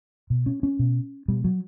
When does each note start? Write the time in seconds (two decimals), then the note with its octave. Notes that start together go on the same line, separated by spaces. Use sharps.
0.30 B2
0.46 C#4
0.63 C#4
0.79 B2
1.28 B2 G3
1.44 F#3